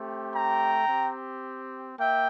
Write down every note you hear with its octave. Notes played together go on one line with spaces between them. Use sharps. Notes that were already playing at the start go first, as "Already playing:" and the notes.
Already playing: A3 C4 G4
G5 A#5
C4 G4
A#3 E5 G5